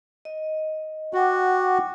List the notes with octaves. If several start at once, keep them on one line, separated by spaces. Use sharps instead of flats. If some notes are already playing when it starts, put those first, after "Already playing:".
D#5
F#4 F#5 G5 D6